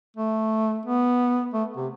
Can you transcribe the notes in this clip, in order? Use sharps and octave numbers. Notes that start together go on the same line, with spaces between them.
A3
B3
A3
C3